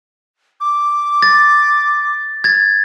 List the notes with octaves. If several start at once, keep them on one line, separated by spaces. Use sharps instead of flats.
D6
A6
G#6 A6